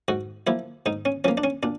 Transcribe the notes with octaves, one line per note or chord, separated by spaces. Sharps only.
G#2 F#4
F3 A#3 E4
G#2 D#4
C#4
F3 A#3 C#4
D4
C#4
A#2 D4